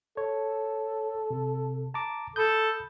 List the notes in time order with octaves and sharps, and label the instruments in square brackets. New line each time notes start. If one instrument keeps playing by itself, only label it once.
[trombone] A4 [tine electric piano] C#5
[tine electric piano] C3
A5 A#5 D6
[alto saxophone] A4 [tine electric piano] B5 D#6 G6